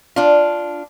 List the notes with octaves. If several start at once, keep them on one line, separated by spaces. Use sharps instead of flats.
D4 F4